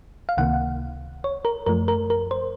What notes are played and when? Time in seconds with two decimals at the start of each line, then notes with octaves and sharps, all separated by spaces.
0.29 F5
0.37 C#2 C3 D#3 A#3 F#5
1.24 C#5
1.45 A#4
1.66 F#2 F3 A3 A#4
1.88 A#4
2.10 A#4
2.31 C5